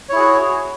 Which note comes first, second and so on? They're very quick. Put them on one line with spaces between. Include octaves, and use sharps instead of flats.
C#5 E4 G#4 F#4